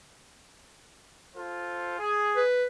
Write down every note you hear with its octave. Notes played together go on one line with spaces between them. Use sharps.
F4 A4 C5
G#4
B4